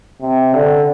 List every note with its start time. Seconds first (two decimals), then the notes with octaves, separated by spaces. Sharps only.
0.22 C3
0.54 D3